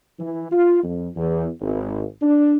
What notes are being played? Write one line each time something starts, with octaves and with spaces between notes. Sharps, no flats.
E3
F4
F2
E2
G#1
D4